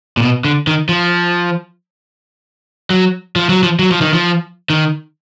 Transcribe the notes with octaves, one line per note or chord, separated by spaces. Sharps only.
A#2
B2
D3
D#3
F3
F#3
F3
F#3
F3
F#3
F3
D#3
F3
D#3